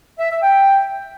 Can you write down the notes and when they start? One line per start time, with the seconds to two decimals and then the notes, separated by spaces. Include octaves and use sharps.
0.19 E5
0.31 E5
0.43 G5